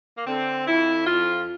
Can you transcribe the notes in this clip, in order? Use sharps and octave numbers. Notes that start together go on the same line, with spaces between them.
A#3
D3 C4
F2 E4
F2 F4